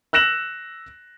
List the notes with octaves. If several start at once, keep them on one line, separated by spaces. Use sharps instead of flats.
E6 F#6 A#6 E7 F#7